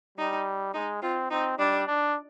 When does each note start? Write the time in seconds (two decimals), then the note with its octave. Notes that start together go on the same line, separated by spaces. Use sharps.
0.18 G3 D#4
0.74 G#3 D#4
1.02 C4 F4
1.30 C4 D#4
1.59 G3 D4
1.87 D4